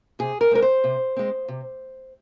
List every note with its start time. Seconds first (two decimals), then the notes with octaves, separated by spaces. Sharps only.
0.19 C3 G#4
0.41 A#4
0.51 G#3 C4 A#4
0.62 C5
0.84 C3
1.17 G#3 C4
1.48 C3